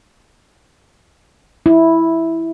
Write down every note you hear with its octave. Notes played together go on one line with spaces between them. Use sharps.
E4